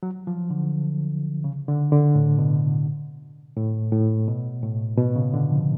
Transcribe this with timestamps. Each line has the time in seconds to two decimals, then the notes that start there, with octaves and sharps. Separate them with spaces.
0.03 F#3
0.27 F3
0.50 D3
1.44 C#3
1.68 D3
1.92 D3
2.15 A2
2.39 B2
3.57 A2
3.92 A2
4.28 B2
4.63 A2
4.98 B2
5.16 C#3
5.34 D3
5.51 F3